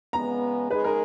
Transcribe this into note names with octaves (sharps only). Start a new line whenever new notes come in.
E2 C#3 G#3 B3 A#5
C#3 G#3 D#4 G#4 B4
A#4